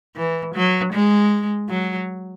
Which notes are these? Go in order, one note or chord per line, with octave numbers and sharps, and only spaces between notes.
E3
F#3
G#3
F#3